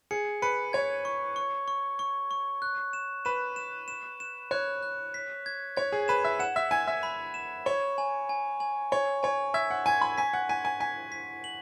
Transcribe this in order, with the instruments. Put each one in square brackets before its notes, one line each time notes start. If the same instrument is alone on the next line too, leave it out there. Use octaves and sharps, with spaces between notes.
[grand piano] G#4 [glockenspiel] C#7
[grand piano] B4 [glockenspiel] C#7
[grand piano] C#5 [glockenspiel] G#6
[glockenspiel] C#6
C#6
C#6
C#6
C#6
F#6
E7
[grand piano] B4 [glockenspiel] E7
[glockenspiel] E7
E7
E7
[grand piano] C#5 [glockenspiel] F#6
[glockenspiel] F#6
B6
G#6
[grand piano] C#5 [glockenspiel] G#6
[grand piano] G#4
[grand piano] B4 [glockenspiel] E7
[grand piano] E5
[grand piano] F#5 [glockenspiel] E7
[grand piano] E5
[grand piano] G#5 [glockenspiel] G#6
[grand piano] E5
[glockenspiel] B5
E7
[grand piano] C#5 [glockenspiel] C#6
[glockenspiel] G#5
G#5
G#5
[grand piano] C#5 [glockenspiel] C#6
[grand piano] C#5 [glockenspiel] G#5
[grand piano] E5 [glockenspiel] G#6
[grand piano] F#5
[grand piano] G#5 [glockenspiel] G#6
[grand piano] B5
[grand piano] G#5 [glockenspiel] B6
[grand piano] F#5
[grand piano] G#5 [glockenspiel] B6
[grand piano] G#5
[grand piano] G#5 [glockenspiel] B6
[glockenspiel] B6
F#7